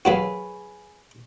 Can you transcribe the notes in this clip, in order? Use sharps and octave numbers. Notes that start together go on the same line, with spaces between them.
F#3 A#3 F#4 G#4 B4 C#5